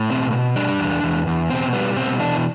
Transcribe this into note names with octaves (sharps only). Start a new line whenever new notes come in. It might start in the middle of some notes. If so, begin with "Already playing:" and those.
Already playing: A2
B2 C4
B2
G3 D4
E2
E2
E2
B2 C4
G3 B3
B2 C4
E3 D4